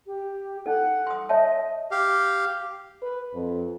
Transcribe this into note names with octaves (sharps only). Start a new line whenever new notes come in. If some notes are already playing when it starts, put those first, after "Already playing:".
G4
D#4 A4 F#5
C6 D#6
C#5 D#5 E5 A5
G4 F5
B4
F2